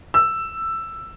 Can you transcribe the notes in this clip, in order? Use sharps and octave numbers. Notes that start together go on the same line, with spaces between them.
E6